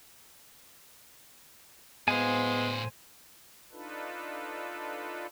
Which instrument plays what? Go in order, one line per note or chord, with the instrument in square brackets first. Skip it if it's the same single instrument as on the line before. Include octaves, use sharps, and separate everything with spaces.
[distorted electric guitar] A2 F5 [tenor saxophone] G#3 [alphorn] B3 [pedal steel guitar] C5 G#5
[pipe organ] D4 D#4 F4 A4 B4